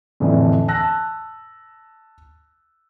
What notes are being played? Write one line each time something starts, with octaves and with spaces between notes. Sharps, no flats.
F2 A2 D3 E3
A5 E6 F#6 A#6